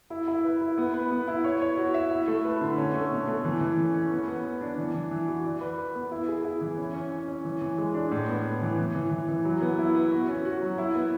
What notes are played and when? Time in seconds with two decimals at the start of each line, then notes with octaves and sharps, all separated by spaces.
0.10 E4
0.28 E4
0.44 B4
0.61 E4
0.78 B3
0.94 B4
1.11 B3
1.27 E4
1.44 C#5
1.61 C#5
1.77 F#4
1.94 E5
2.11 E4
2.28 A3
2.44 B4
2.61 D3
2.78 C#4
2.95 A3
3.11 B2
3.27 A3
3.44 E3
3.61 E3
3.78 C#4
3.94 C#4
4.11 B3
4.28 B3
4.45 B3
4.61 D4
4.78 E3
4.94 E3
5.11 E3
5.28 F#4
5.45 D5
5.61 B4
5.78 B4
5.95 B3
6.11 E4
6.28 G#4
6.45 E4
6.61 E3
6.78 C#4
6.95 C#4
7.12 C#4
7.28 C#4
7.45 E3
7.62 E3
7.78 G#3
7.94 D4
8.11 A2
8.28 B3
8.45 A2
8.62 E3
8.78 E3
8.95 E3
9.12 E3
9.29 E3
9.45 F#3
9.61 B3
9.78 E4
9.95 B3
10.11 F#4
10.29 C#4
10.45 F#4
10.61 F#3
10.78 E4
10.95 B3